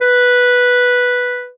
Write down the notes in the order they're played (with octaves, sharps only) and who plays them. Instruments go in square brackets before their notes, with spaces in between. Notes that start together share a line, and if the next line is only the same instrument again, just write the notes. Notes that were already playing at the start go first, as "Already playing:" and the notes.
[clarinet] B4